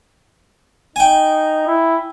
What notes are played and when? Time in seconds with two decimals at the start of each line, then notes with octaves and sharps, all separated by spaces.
0.96 D#4 G5 G#5
1.67 E4